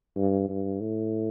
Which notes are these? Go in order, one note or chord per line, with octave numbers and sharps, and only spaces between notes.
G2
G2
A2